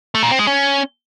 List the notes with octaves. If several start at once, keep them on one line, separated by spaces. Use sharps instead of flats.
A3
A#2
C4
G#3
C#4